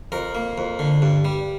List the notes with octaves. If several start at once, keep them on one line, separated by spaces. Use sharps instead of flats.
F2 A#4
A#3
F2
D3
G2
G3